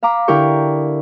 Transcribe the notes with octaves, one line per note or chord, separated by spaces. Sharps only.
F5 A#5 B5 D6
D3 E4 G4 A#4 G5 C#6